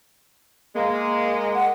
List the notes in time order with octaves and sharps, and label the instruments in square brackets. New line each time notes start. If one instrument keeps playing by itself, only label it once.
[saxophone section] G#3 [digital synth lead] A#3
[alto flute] F#5